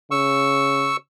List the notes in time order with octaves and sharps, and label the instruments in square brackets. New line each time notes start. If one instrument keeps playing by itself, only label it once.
[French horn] C#3 [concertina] C#6 E6